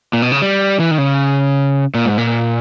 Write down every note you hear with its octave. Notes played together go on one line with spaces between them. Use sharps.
A#2
B2
C#3
G3
E3
D#3
C#3
A#2
G#2
A#2